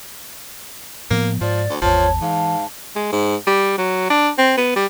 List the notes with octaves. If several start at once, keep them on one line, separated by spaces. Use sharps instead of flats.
A2 F3 A#3 B3
G#2 F3 D5
D2
G#1 E2 F3 C#5 A5
G#2 E3 F5
G#3
G#2
G3
F#3
D4
C4
B3
G3